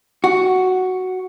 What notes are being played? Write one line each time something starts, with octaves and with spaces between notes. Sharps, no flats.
F#4